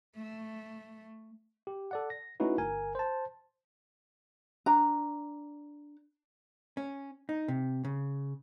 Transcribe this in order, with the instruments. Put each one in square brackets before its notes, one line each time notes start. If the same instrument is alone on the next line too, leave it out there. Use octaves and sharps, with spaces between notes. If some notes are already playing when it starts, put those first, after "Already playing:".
[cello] A3
[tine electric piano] G4
A4 D5 F#5
A#6
A3 C#4 D#4 E4 F#4 B4
G1 A#4 G#5
C5 A5
[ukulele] D4 A#5
[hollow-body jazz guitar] C#4
D#4
C3
C#3